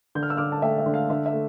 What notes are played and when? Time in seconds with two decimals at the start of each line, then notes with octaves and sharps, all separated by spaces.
0.15 D3 G6
0.23 F6
0.30 E6
0.37 D3 D6 F6
0.52 A5
0.62 A3 E5 G5
0.78 E5
0.86 D3
0.94 F5
1.10 D3 E5
1.26 E5
1.33 A3